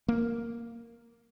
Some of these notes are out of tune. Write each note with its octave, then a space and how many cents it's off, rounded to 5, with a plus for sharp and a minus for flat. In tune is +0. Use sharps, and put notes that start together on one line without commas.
A#3 -5